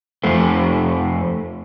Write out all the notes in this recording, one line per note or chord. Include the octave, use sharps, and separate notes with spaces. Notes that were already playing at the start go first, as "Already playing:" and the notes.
F2 A3 C4